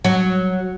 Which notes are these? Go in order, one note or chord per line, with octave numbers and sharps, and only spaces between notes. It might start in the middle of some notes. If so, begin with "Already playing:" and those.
F#3